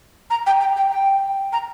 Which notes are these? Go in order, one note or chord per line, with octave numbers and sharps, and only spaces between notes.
A#5
G5
G5
G5
G5
A#5